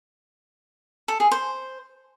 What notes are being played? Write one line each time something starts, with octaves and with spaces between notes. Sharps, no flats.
A4
G#4
C5